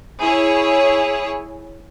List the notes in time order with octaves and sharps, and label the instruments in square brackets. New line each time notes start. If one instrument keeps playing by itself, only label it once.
[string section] E4 G#4 C#5